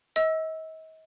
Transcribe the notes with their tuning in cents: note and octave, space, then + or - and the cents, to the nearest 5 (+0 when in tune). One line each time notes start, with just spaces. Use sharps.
D#5 +40 E6 +0